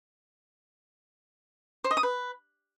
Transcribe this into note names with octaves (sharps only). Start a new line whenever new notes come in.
C5
D#5
D#6
B4